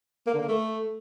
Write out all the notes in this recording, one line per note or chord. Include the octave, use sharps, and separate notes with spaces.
A#3
D3
A#3
A3